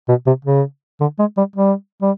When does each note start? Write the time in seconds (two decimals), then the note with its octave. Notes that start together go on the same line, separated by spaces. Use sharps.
0.09 B2
0.27 C3
0.45 C#3
1.01 D3
1.19 G#3
1.37 G3
1.56 G3
2.02 G3